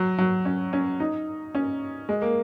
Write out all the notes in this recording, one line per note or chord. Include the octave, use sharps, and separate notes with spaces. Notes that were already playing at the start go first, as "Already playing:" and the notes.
Already playing: F#3
F#3
C#4
C#4
D#4
C#4
G#3
A#3